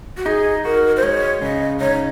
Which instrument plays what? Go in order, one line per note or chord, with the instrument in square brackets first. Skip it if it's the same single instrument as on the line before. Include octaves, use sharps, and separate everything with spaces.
[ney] F#4
[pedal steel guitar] D#4 [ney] G#4
[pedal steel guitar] F#4 [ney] A#4
[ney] C5
[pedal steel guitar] G#3 [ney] C#5
[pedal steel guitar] C#3 [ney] D#5
[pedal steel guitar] D#4 [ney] C#5